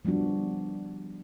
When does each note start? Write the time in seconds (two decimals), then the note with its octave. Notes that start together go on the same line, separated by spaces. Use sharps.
0.05 F3 G3 B3 D4 F#4